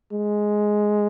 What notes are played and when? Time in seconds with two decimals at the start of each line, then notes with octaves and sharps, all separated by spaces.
0.12 G#3